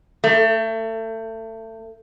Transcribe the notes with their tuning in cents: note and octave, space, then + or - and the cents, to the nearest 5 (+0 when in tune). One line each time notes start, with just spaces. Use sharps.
A3 +30